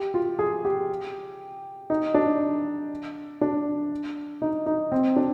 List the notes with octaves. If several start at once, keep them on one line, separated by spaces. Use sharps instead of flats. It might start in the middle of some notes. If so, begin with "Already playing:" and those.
Already playing: G4
F4
G#4
G4
D#4
D4
D4
D#4
D#4
C4
D4